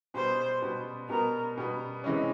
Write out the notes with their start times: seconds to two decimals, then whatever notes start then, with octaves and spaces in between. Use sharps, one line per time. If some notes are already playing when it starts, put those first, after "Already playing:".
0.14 B2 G3 B3 C5
0.62 B2 G3 B3
1.09 B2 G3 B3 A#4
1.57 B2 G3 B3
2.04 C3 E3 G#3 C#4